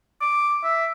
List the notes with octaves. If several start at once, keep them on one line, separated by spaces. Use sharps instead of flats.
D6
E5